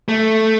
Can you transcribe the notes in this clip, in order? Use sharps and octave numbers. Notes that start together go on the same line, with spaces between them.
A3